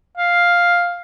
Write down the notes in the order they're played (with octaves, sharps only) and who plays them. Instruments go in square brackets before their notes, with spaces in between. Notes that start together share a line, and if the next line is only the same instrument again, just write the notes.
[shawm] F5